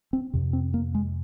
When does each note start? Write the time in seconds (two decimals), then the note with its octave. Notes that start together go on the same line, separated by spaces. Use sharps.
0.13 C4
0.33 F2 C3
0.53 C4
0.74 A#3
0.95 G#3